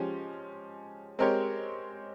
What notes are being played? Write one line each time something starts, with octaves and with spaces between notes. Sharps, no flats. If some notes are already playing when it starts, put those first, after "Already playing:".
Already playing: F3 G#3 C#4 G4
G#3 C4 G4 A#4 C#5